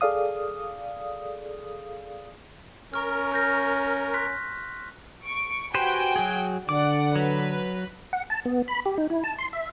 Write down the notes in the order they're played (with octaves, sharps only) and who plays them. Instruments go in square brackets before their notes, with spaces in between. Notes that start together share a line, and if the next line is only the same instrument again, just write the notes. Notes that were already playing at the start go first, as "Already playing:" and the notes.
[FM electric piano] G#4 A4 D5 F5 D#6
[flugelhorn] C#4 [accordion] A#4 [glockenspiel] C#6 F6
[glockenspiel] F6 G6 A#6
C6 F#6 B6
[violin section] C#6 D7
[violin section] F#4 G5 G#5 [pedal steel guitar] G4 B4 C5
[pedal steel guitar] F#3 G#4
[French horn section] D3 [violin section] D5 F#5 [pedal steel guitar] D6
[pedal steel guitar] F#3 [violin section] B4
[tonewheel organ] F#5
A5
B3
B5
G4
D#4
E4
A5
C6
E5